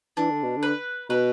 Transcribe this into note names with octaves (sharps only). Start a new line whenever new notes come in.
E3 D4
D3
B2
D3
B4
B2 B4